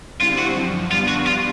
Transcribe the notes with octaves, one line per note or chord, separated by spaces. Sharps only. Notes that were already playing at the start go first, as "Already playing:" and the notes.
D3 G3 C4 E4 F4
F#4
F#2 D3 F3
G3 B3 D4 F4
F#4
F4